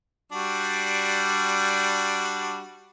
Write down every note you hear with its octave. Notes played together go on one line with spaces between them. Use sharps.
G3 D4 F#4